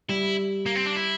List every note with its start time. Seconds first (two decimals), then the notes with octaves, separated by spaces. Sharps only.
0.09 G3 E4
0.66 A#3
0.76 C4
0.85 D4
0.96 E4